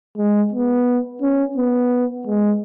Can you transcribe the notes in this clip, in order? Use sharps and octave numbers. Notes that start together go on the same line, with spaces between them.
G#3
B3
C#4
B3
G#3